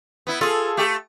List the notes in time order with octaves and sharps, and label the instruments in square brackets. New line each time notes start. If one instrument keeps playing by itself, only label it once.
[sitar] B3 E4
[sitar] F4 [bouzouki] G#4 A4
[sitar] A3 G4